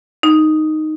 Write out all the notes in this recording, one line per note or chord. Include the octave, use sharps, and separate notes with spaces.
D#4